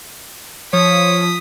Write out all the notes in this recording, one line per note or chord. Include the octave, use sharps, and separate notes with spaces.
F3 C#5 D#6 B6